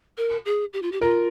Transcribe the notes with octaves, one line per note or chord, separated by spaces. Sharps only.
A#4
G#4
G4
F4
G4
F4 A#4